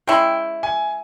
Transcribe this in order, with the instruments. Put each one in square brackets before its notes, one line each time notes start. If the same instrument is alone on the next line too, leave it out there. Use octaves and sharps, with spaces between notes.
[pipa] G#3 C#4 E4 [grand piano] G5
[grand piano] G#5